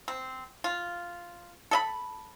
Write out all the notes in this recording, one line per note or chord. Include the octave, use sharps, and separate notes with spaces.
C4
F4
A4 D#5 B5